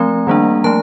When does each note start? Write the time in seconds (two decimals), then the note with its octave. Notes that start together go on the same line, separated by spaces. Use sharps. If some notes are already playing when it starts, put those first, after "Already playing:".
Already playing: F3 A3 C4 A#5
0.27 D#3 G3 A#3 D4
0.64 F3 A3 A5